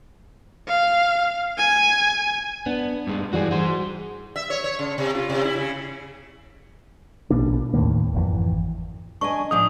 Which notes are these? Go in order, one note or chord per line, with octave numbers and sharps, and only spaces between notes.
F5
G#5
B3 D4
G2 G#3
G2 E3 F#4 G#4 D5
F#4 G#4 C5
E5
C#5
C#5
C#3
C3
F4
C3
E4
C#3
A#1 B2 A#3 D4
D#2 A2 D#3 A#3
G#1 F2 D#3 E3
D4 D#5 G#5 C#6
G#2 F3 D4 D#6